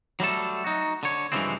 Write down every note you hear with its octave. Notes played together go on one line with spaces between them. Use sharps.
F#3 G3 A3 A4
D#4 F#4
D3 C#5
G2 C#3 E3 F3 G#3 C4